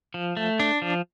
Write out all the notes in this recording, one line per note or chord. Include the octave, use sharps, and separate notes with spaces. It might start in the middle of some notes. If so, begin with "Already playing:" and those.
F3
A3
D4
F3